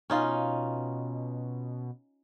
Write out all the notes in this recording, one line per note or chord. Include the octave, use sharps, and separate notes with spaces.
B2 C#4 D#4 F4